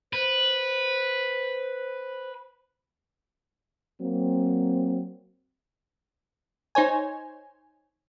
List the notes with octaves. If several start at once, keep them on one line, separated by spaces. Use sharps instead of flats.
B4 C5
F#3 A#3 C4
D#4 C5 C#5 G#5